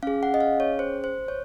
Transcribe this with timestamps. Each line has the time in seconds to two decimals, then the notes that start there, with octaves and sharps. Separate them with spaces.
0.03 C#4 G#4 F5
0.23 F#5
0.34 D#5
0.41 F5
0.60 C#5
0.79 C5
1.04 C5
1.28 C#5